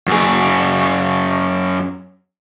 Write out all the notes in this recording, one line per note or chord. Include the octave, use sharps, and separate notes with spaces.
F#2 G#4